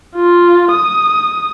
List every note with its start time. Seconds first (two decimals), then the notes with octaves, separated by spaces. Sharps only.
0.16 F4
0.71 D#6